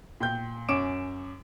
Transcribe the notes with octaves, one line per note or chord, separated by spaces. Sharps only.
A#2 G5 G6
F#2 C#4 C#5 D6 D7 E7